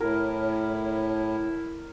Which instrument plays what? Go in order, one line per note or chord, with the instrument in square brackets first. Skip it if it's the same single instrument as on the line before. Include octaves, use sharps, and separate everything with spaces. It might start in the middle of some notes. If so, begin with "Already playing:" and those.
[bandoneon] A2 [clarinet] E4 [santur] A#4 [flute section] C#5